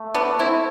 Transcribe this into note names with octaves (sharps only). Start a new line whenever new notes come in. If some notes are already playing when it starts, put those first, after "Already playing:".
Already playing: A3
B3 D4
C4 E4